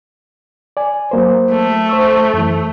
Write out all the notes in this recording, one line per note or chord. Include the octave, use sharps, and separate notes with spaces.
D5 G#5
F#3 A#3 C5
A3
C5 C#6 E6
F#2 E3